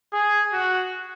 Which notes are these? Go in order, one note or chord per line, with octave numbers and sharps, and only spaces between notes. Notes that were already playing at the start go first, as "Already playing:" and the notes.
G#4
F#4